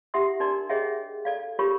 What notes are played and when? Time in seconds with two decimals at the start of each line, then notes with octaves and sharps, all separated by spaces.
0.14 E4 G4 E5 F#5 C6 D#6
0.40 D4 D#4 A#4 D5 C6
0.69 G#4 C#5 D#5 E5 F#5 G5
1.25 A4 D5 F5
1.59 F4 G4 A#4 C#5 B5 C#6